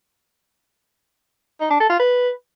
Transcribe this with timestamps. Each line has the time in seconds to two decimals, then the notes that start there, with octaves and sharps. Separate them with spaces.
1.60 D#4
1.70 D4
1.80 A4
1.90 F4
1.99 B4